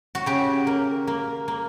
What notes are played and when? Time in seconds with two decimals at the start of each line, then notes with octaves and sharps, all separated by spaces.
0.15 F#4
0.26 C#3 G4
0.67 A#3
1.07 A#3
1.48 A#3